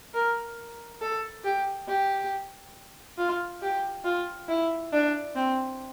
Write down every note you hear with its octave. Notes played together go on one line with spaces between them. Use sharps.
A#4
A4
G4
G4
F4
G4
F4
E4
D4
C4